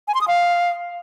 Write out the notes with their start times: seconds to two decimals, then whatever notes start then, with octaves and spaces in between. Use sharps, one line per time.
0.08 G#5
0.14 C6
0.21 D#6
0.28 F5